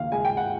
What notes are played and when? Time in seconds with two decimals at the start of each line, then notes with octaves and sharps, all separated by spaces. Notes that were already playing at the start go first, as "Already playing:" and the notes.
Already playing: D#2 D#3 F5
0.12 G#3 G#5
0.25 G5
0.37 F#5